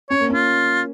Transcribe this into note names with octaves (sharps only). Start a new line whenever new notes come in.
C#4 C#5
A#3
C#4 F4